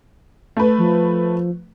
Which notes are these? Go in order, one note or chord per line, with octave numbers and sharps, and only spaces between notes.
A3 B4
F3